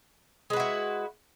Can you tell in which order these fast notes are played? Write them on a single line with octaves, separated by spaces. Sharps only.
G#3 B4 F#4 E4